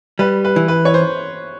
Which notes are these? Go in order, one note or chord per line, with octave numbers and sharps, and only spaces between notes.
G3 B4
B4
E3
B4
C#5
C5